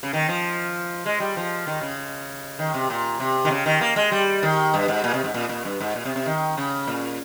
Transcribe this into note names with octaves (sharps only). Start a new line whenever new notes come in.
C#3
D#3
F3
G#3
G3
F3
D#3
C#3
D#3
C3
A#2
C3
D#3
C#3
D#3
A#3
G#3
G3
D#3
G2
G#2
A#2
C3
G#2
A#2
A#2
G2
G#2
A#2
C3
C3
D#3
C#3
A#2